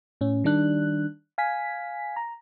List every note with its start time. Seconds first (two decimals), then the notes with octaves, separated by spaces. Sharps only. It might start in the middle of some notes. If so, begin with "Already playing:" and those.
0.21 A2 C#4
0.44 D#3 G3 D4 F#6
1.38 F5 G#5 B6
2.16 A#5